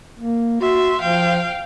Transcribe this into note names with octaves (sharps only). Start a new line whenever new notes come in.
A#3
F#4 E5 C6
F3 F5 G5